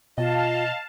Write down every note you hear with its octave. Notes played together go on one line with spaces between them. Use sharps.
B2 F4 D#5 F5 A5